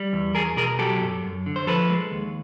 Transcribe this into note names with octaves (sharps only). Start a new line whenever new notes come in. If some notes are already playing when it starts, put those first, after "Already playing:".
Already playing: G3
E2
E2 G#4 A#4
B2 G#4 A#4
F#3 G4 A4
F#2
F#2
D3
C5
F3 A4 B4
G#3
D#2